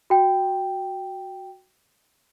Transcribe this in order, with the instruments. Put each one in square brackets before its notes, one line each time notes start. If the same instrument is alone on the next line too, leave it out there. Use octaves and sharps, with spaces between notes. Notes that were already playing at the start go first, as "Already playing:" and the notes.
[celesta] F#4 G5